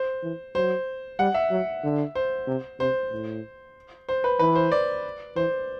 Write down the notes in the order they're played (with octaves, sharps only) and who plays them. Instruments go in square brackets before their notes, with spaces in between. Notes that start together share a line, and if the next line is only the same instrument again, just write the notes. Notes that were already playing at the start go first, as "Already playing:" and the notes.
Already playing: [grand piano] C5
[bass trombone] E3
[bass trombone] F#3 [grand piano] C5
[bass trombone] G3 [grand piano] F#5
[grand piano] E5
[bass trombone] F#3
D3
[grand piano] C5
[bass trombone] C3
[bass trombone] C3 [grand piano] C5
[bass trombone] A2
[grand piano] C5
B4
[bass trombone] E3 [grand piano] B4
[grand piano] C5
D5
[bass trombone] E3 [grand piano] C5